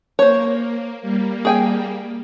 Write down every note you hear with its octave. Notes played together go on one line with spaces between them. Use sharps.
A#3 C5 C#5
G3 A#3
G#4 G5 G#5